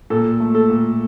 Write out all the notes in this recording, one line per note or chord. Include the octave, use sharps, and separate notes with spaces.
A#2 A4
A3
A4
A#2